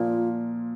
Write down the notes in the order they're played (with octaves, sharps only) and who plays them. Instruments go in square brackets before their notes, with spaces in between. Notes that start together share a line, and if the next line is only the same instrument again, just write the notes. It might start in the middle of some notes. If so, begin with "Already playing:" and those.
Already playing: [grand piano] A#2 F3 A#3 [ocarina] F4